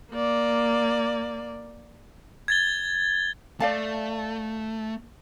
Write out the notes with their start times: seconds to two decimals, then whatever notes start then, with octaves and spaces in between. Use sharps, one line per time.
0.11 A#3 D5
2.48 G#6 A6 G7
3.60 A3 D5 F5 A5